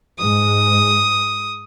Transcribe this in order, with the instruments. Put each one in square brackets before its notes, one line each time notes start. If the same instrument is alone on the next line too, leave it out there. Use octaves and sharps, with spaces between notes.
[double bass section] G#2 G#3 [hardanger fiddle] D#6